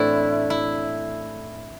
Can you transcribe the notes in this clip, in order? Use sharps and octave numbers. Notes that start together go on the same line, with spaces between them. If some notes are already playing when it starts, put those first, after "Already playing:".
Already playing: A2 E3 A3 C4 D4 E4
E4